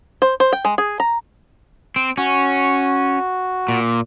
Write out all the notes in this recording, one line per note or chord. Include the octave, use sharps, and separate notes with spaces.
C5
C5
G5
G#3
G#4
A#5
C4
C#4 F#4
A#2